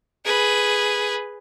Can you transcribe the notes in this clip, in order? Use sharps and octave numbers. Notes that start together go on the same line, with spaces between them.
G#4 B4